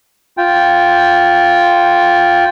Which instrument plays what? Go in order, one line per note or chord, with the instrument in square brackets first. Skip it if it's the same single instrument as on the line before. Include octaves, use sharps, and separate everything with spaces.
[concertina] F4 G5